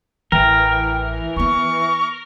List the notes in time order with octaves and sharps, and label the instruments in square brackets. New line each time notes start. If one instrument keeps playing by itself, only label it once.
[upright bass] A1 [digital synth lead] E3 [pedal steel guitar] A#4 [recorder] G5
[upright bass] B3 E4 [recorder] C#6